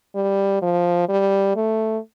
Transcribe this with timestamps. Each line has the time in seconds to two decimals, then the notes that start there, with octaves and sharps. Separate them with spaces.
0.15 G3
0.62 F3
1.09 G3
1.56 A3